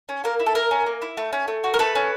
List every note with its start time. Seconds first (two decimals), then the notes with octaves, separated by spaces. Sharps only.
0.09 C#4
0.24 A#3 A#4
0.40 E4
0.46 A4
0.55 A#3 A#4
0.71 C#4
0.86 A#3
1.02 E4
1.17 A3
1.33 C#4
1.48 A3
1.64 F#4
1.74 A#4
1.79 A3 A4 B4
1.95 C#4